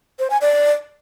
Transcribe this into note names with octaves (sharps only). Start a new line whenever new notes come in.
C5
G#5
D5